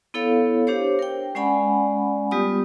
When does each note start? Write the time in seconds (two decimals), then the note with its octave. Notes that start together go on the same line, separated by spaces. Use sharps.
0.14 B3 E4 A4 C#5 F5
0.67 D4 G4 C5 C#5
0.99 A#4 G5
1.35 G#3 C#4 D5 F#5 G#5 B5
2.31 G3 B3 F4 G4 D#6